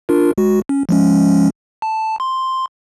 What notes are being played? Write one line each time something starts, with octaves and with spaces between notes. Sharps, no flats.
D4 F4 A#4
G#3 F#4
C#4
F3 G#3 C#4
A5
C6